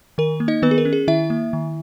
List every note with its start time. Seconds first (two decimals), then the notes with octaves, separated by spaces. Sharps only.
0.18 D#3 A#4
0.40 A#3
0.48 D#4 D#5
0.62 D#3 B3 B4
0.71 G#4
0.78 A#4
0.85 C#4
0.93 G#4
1.08 D#3 E4 E5
1.30 A#3
1.53 D#3